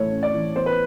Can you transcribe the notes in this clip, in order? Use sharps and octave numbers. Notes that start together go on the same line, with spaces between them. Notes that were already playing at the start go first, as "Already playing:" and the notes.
Already playing: A2 E3 A3 C#5
C#4
D5
E3
B3 C5
B4